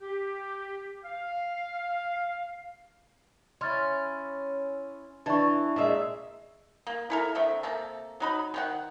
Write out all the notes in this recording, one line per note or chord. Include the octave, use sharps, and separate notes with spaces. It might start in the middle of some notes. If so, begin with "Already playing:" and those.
G4
F5
C#4 E4 C6 F6 A6
E3 D4 D5 A5 C#6
A#2 G#3 E5
A#3
E4 A4 A#4
D3 A3 C4 E5
C3 A#3 A4
F#3 D#4 B5
D#3 E4 F#5